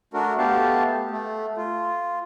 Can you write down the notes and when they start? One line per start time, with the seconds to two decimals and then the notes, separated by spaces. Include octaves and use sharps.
0.14 A3 D4 F#4 A#4
0.38 A3 B3 G4 F5 A5
1.11 A3
1.57 F4